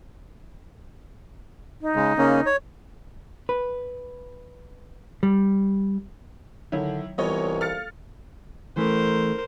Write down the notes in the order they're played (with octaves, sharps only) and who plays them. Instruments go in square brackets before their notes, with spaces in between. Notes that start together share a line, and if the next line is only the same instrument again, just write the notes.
[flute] D#4
[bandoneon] C#3 G#3
C#3 A#3 C#4
C#5
[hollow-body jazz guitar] B4
G3
[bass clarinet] D3 [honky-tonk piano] D#3 E4 [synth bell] F#3 C#5 E5
[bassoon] C2 [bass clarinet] E3 [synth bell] G3 B3 F4 [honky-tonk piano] C#5 D#5
[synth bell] A4 F5 [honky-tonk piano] F6 A6 C#7
[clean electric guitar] E3 A3 [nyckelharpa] A#4 C5